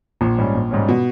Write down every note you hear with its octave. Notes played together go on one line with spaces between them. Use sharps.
A#1 A#2
G#2 G3 C#4
A#1
G#2 G3 C#4
B2